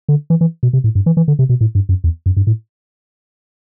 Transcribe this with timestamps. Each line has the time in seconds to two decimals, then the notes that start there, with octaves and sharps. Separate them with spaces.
0.09 D3
0.30 E3
0.41 E3
0.63 B2
0.73 C3
0.84 A2
0.95 G2
1.06 E3
1.17 E3
1.28 D3
1.39 C3
1.49 B2
1.61 A2
1.75 G2
1.89 F#2
2.04 E2
2.26 F#2
2.37 G2
2.47 A2